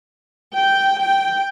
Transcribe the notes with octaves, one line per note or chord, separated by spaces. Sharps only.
G5
G5